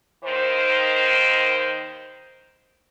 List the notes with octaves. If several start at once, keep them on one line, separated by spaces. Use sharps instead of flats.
D#2 D#3 C5